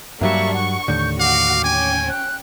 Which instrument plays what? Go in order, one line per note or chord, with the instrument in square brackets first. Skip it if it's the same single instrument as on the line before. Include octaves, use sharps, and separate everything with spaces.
[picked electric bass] G2 F#3 G3 [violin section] A#3 D4 C#6 [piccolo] E5
[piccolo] F#5 [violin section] C#6
[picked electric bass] D#2 A2 D3 [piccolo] G6
[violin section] F#4 [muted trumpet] F5 [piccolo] D6
[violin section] C#4 G5 [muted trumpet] G#5
[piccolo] F#6